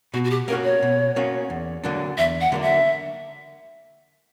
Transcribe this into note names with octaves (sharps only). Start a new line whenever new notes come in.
B2 F#4
F#4
G4
A#3 C#4 F#4 A#4
C#5
B2
A#3 C#4 F#4
E2
D3 F#3 A#3 D4
E2 E5
F#5
D3 F#3 A#3 D4
E5